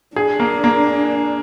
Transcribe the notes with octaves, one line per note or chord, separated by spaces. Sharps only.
D4 G#4
A#3
A#3